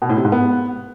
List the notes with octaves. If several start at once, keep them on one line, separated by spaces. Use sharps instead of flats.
B2
A2
C3
G#2
B3